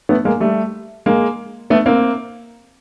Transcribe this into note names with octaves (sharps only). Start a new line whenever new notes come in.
A3 B3
G#3 A#3
G3 A3
G#3 A#3
A3 B3
A#3 C4